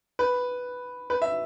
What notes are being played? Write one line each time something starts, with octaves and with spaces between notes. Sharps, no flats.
B4
B4
E5